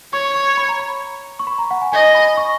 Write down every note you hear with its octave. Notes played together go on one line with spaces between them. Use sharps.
C#5 C#6
C#6
B5
A#5
B5
C#6
B5
A#5
F#5
G#5
D#5 G#5
B5
C#6